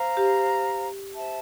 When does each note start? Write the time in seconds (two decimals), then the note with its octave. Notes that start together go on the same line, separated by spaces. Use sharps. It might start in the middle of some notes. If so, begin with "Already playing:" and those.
Already playing: C5 F5 A#5
0.17 G4
1.15 C5 E5 A5